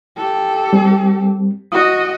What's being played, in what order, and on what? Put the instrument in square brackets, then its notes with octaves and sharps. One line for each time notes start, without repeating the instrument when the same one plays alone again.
[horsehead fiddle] G4 A4
[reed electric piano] G3 C4
[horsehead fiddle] F#4 D#5 [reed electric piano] D#6